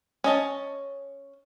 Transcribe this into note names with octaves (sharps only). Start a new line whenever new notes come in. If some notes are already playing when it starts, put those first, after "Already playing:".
C#4 D#5 A5